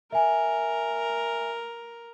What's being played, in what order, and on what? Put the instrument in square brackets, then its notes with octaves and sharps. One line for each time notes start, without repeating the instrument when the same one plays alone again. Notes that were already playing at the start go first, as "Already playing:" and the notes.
[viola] A#4 [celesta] E5 G#5